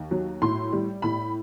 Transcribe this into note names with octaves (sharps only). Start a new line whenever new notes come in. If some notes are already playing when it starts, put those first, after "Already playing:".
Already playing: D#2
F#3
A2 C6
G3
A2 B5